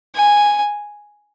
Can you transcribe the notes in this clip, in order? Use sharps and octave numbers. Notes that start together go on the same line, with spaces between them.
G#5